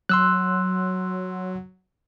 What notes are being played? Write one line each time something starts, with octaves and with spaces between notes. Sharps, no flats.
F#3 C6 E6 F#6